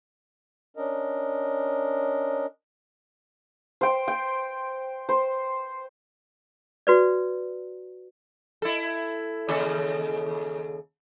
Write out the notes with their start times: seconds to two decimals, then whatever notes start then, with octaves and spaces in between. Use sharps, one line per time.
0.77 C#4 D4 A#4 D#5
3.81 C5 G5
4.08 G5
5.09 C5
6.87 F#4 B4 D5
8.62 E4 A4
9.49 D#2 C#3 A4